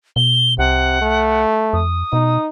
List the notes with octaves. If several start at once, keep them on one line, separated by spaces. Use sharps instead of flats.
B2 G7
C2 C3 F#5
A3
F2 D#6
B2 D#4